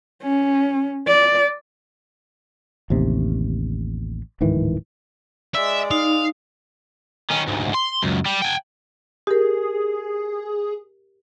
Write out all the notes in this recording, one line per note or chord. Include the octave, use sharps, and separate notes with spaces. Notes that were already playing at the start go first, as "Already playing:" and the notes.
C#4
D5
A1 D#2 C3
D1 G#2 D#3 E3
G#3 D5 E5
D#4 F5
D#3 C#4
D2 G#2
C6
C#2 F#2
G3
G5 G#5
G4 G#4 A#4